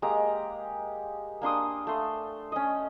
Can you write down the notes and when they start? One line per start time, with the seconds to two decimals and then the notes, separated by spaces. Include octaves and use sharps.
0.02 G#3 A#3 G4 A#5
1.42 A#3 D4 C6 D#6
1.87 A3 C6
2.52 C#4 D#5